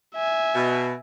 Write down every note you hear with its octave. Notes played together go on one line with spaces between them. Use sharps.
E5 G#5
B2